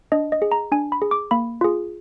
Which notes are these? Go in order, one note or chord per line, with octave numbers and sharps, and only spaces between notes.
D4 D#5
D#5
G#4
A#5
D4 G#5
B5
G#4
D6
A#3 B5
F4 G#4